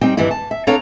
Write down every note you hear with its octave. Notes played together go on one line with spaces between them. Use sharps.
G3 C4 D#4 G5
G2 D#3 E3 G3 E4
A5
E5
C4 D4 A4 C#5 F5 A#5